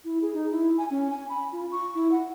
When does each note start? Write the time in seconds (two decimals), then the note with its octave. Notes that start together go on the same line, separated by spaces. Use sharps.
0.05 E4
0.22 G#4
0.34 D#4
0.51 E4
0.78 G#5
0.91 C#4
1.10 G#5
1.29 B5
1.52 F4
1.72 C#6
1.95 E4
2.11 F#5